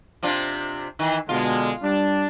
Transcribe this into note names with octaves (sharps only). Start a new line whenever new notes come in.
C3 D4 F4
D#3 E3
B2 D3 G#3 F4
G3 D4